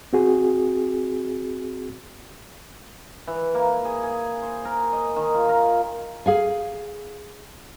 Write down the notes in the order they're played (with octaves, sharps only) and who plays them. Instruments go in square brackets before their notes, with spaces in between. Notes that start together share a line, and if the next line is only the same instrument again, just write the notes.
[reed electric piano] C4 F#4 G#4
[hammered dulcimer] E3
A#3
G#4
G#4
C5
A#4
D#5
D#3
F4
A#4
[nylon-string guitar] G#4 F5 G#5